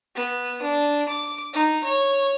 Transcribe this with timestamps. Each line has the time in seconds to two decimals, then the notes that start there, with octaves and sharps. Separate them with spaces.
0.16 B3
0.62 D4
1.08 D6
1.53 D#4
1.84 C#5